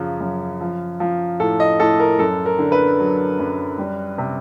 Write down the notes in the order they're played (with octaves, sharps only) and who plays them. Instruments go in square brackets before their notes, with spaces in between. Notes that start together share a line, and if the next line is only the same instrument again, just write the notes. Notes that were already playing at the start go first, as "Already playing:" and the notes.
Already playing: [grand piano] F#2 C#3 F3
F#2
F3
F3
A2 A4
D#5
A2 A4
A#4
F#2 A4
A#4
D3
B4
F#3
F#2
G3
C3